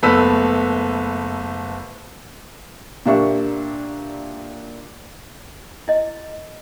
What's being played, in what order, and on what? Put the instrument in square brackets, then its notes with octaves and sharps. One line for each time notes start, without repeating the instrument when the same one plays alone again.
[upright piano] F#1 A3 B3 B4 E6 B6
[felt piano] A#2 A#3 D4 G4 E5 C#6
[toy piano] E4 D#5